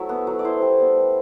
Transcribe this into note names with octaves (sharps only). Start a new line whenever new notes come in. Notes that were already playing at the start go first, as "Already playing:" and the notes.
Already playing: F#3 A3 E4 E5
B3
F#3
D5
E4 C5
G3
B3
G3